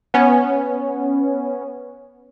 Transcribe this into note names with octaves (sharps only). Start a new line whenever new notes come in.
B3 C#4